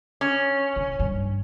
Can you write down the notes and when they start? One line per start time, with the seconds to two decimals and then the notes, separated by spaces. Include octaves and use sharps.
0.21 C#4
0.76 C3
1.00 G2